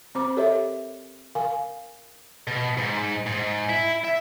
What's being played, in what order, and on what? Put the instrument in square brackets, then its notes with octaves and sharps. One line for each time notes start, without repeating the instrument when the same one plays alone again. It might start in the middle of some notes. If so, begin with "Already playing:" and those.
[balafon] C4 C5 A#5 D6
G4 A4 A#4 C#5 D#5 E5
A#4 F5 G#5
[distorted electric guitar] B2
G#2
G#2
E4
E5